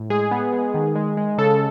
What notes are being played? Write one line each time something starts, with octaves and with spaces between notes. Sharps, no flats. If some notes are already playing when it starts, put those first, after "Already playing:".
Already playing: A2
G#3 G#4
B3
G#3
D#3
G#3
G#3
C#3 A4